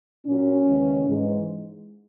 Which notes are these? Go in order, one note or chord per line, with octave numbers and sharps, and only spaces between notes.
A#2 F#3 C#4
D#2 C#3 E3 G#3
G#2 E3 G#3